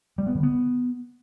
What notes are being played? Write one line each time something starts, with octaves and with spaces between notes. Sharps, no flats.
G3
B3
D3
B3